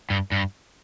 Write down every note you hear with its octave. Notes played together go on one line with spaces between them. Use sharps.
G2
G2